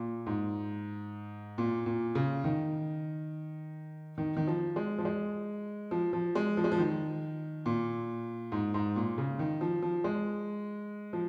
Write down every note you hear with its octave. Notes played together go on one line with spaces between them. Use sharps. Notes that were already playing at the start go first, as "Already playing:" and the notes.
Already playing: A#2
G#2
A#2
A#2
C#3
D#3
D#3
D#3
F3
G#3
F3
G#3
F3
F3
G#3
F3
G#3
F3
D#3
A#2
G#2
G#2
A#2
C#3
D#3
F3
F3
G#3
F3